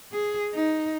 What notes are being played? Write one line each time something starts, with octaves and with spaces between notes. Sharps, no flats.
G#4
D#4